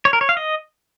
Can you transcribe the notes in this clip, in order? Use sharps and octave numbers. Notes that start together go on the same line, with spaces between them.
C#5
A#4
C#5
F5
D#5